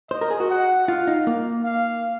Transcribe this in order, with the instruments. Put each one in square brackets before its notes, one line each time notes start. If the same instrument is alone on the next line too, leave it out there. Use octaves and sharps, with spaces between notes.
[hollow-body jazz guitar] C5 [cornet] D#5
[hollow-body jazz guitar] A#4
G#4
F#4
[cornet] F#5
[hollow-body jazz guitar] F4 [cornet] F5
[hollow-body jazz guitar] D#4
A#3
[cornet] F5